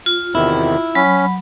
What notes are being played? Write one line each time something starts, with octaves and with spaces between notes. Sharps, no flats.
F4
E2 C3 D#3 E4
F#3 C#4 B5